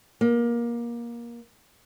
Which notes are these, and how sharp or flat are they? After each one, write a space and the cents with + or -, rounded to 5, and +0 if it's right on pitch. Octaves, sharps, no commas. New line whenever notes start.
A#3 +20